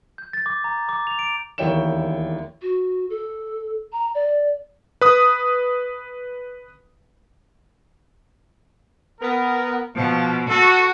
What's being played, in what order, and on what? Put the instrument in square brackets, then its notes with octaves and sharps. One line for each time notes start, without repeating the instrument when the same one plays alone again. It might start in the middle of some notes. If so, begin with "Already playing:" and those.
[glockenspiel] G6
A6
D6
A#5
D6
F7
D7
[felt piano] E1 D#2 E4 C#5 G5 E7
[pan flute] F#4
A4
A#5
D5
[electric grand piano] B4 D#6
[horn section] B3 A#4
[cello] B2 [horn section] F3
[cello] F#4 [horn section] A4